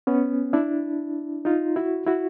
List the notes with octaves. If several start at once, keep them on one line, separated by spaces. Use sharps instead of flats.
B3 C#4
D4 E4
D#4 F4
E4 F#4
E4 F#4